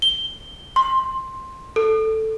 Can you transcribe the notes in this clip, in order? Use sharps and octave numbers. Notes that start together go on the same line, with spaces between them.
G7
C6
A4